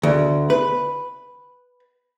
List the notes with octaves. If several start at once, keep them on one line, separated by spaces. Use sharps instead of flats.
D2
B4